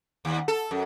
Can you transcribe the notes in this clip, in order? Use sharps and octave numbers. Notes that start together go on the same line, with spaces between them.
D#2
A4
F#2